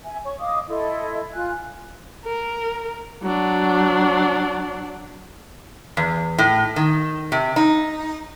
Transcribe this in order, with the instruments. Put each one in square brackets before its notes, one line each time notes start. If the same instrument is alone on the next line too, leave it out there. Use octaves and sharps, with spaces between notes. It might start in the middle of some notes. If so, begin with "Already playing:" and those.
[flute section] E5 G#5
C#5 C#6
D#5 F5 D6 D#6
E4 A4 D#5 C6
F4 G#5 F#6
[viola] A#4
F#3 D4
[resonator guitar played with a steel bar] E2
A2
D#3
C3
D#4